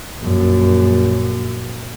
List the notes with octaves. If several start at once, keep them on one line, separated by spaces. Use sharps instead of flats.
A#1 F#2